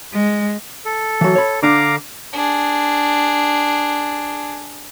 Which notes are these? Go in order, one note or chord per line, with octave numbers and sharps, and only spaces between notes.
G#3
A4
E3 F#3
C#5 B5
D3 D4 F5 A#5 D6
D4 G#4